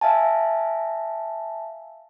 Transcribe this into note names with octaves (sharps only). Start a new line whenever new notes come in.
E5 F5 G#5 A5